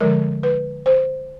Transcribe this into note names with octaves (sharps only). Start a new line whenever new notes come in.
D3 F3 G#3 A#4
B4
C5